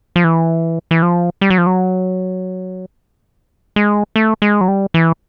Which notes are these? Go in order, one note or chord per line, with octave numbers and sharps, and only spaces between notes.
F3
E3
E3
F3
G3
F#3
F3
F#3
G#3
A3
G#3
F#3
G3
E3